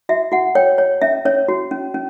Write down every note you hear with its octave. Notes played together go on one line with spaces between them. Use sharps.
F#4 E5
F#4 F#5
C#5 G5
C#5
C#4 E5
C#4 C#5
F#4
C#4
C#4